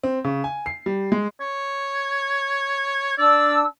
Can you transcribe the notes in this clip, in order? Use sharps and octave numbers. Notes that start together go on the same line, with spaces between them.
C4
C#3
G#5
C7
G3
G#3
C#5
D4 D5 E6